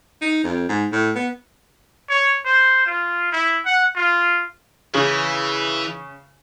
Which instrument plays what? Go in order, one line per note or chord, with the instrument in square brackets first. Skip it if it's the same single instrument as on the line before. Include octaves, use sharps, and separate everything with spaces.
[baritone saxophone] D#4
F2
G#2
A2
B3
[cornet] C#5
C5
F4
E4
F#5
F4
[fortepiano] C#3 [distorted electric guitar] E3